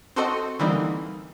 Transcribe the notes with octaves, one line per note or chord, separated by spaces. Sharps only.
C4 F#4 A4 C5 D#5 C#7
D3 E3 G3 A#3 C4 D#4